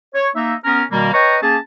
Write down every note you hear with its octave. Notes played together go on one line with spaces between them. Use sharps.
C#5
A#3 D#4 E5
B3 C#4 A#4
B2 D#3 G3 A#3
B4 C#5 D#5 G5 A#5 C#6
A#3 C#4 G#4 A5